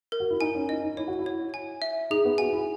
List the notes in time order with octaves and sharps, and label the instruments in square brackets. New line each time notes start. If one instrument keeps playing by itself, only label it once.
[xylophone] A#4
[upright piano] F#4
E4
[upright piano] D#4 [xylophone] G#5
[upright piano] C#4
[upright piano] D#4 [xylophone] D#5
[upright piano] D#4
[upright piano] E4 [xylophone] C#5
[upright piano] F#4
E4
[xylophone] C#5
G#5
E5
[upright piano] D#4 [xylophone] G#4
[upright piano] B3
[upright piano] F#4 [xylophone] G#5
[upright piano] E4